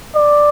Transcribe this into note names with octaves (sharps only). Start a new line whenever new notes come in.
D5